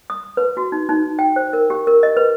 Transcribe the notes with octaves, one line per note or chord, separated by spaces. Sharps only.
D#6
B4
F#4
D#4
D#4
G5
C5
A#4
G4
A#4
D#5
B4